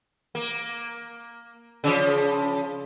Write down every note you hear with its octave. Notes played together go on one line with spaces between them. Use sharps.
A#3
C#3 F3